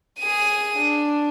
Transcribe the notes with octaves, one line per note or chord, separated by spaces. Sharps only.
G#4 D#7
D4